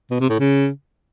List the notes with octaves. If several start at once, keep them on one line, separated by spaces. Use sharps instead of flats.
B2
C3
A2
C#3